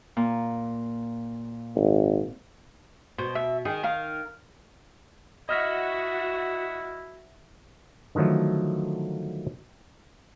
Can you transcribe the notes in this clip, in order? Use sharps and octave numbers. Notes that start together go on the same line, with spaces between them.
A#2
G#1
B2 C5
E5
D#3 G#4
A#4 F5
E4 F#4 D#5 E5 F#5 F6 A#6
D3 D#3 F3 F#3 A3